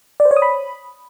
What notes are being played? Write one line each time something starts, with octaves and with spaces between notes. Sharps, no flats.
D5
C5
C#5
D#6
B5